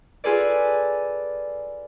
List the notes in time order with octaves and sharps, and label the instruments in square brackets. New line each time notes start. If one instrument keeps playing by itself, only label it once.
[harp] F4 G#4 A4 B4 D5